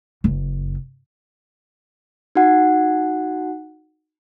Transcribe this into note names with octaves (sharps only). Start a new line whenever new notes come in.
F#1
D#4 F#4 F#5